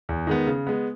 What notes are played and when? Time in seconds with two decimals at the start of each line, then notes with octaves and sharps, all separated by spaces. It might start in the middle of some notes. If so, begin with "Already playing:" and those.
0.09 E2
0.27 D#3 G#3 B3
0.47 C#3
0.67 G#3 B3